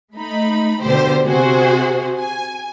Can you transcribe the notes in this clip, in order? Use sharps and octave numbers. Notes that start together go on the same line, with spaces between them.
A3 D#4 B5
B2 D3 G4 C5
C3 F#4 G#4 C5
G#5